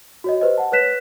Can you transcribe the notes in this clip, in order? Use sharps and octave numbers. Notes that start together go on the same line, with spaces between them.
F#4 C#5 D#5
G4 B4 C5 D#5
F#5 A5
B4 C#5 F#6 B6 E7